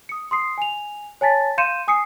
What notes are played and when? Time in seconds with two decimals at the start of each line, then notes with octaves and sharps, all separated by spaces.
0.09 D#6 C#7
0.31 C6 D#6 C7
0.58 G#5 F7
1.21 C#5 G#5 A5 A6 B6
1.58 F5 C6 G6 C#7 D#7 E7
1.88 G#5 D#6 C7 C#7